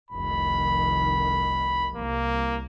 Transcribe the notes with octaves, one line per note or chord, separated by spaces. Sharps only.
F1 C2 D#3 B5
C2 A#3